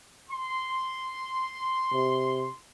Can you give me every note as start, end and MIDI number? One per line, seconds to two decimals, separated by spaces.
0.30 2.55 84
1.93 2.48 48